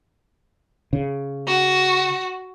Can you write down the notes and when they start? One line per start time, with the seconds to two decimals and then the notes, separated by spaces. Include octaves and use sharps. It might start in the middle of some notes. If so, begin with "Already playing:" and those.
0.93 C#3
1.48 F#4